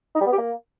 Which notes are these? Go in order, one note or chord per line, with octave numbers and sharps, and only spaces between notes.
D#4
G3
B3
G4
A#3